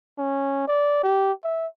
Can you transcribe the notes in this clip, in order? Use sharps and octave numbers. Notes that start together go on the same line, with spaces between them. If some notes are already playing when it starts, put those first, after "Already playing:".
C#4
D5
G4
E5